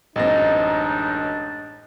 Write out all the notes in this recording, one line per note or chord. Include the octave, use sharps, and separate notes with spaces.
A1 F#2 G#3 C4 D4 D#4 A#6